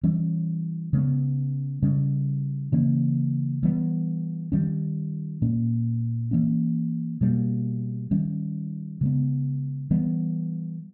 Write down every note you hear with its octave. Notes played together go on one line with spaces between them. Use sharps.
E3 G3 C#4
C#3 G#3 B3
C#3 G3 C#4
C#3 E3 A#3 C#4
E3 G3 B3
D#3 G3 C#4
A#2 A#3 C#4
E3 A#3 C#4
B2 G3 A#3
D#3 G3 C#4
C#3 G#3 B3
E3 G3 B3